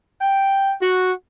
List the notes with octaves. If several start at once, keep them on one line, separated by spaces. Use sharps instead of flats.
G5
F#4